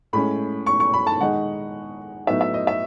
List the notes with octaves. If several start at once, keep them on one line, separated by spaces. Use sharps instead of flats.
A2 G#3 C#4 B5
C#6
C#6
B5
A5
D#3 G#3 D#4 F#5
A2 F#3 B3 D#4 E5
E5
D#5
E5